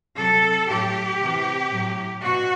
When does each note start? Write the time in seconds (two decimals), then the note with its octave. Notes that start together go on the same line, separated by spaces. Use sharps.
0.16 C3 F#3 A4
0.69 A2 F#3 G4
1.20 C3 E3
1.72 A2 F#3
2.23 B2 F#4